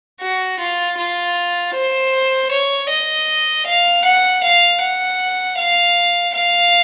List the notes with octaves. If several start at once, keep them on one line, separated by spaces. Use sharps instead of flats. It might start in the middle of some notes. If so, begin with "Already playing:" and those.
F#4
F4
F4
C5
C#5
D#5
F5
F#5
F5
F#5
F5
F5